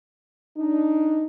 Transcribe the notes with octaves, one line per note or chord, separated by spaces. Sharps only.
D4 D#4